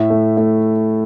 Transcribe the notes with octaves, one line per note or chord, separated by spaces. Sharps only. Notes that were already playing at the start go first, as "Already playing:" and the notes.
Already playing: A2 E5
A3
A3